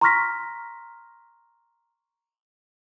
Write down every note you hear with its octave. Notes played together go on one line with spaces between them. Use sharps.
A#5 C6 C#6 F6 A#6 B6